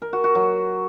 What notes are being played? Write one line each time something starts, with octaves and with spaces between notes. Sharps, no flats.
A#4
F#4
F#4
F#3